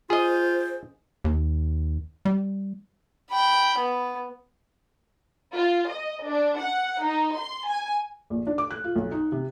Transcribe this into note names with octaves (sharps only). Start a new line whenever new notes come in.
F4 G#4 C5 D#5
D#2
G3
G5 B5
B3
F4
D#5
D4
F#5
D#4
C6
G#5
A#1
D4
D6
F#6
F4
B1
D#4
C3